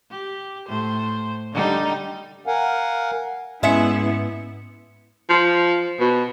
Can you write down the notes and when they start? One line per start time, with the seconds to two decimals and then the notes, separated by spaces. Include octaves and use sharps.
0.11 G4
0.68 A2 C5
1.53 D3 G3 D#4
2.47 A#4 F5 F#5 G#5
3.63 G#2 G#3 B3 C#4 E4 E5 C#7
5.30 F3
6.00 B2